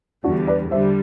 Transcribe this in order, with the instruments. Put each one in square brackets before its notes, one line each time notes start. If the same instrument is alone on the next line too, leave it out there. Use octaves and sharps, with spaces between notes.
[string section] E2 D3 G3 [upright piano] D4 F#4
[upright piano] B4 D5
[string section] D3 G3 [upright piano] C5 E5